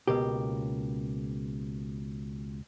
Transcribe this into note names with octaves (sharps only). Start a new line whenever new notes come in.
C#2 B2 A#3 G4